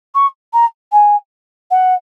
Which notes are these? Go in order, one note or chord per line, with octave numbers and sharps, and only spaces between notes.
C#6
A#5
G#5
F#5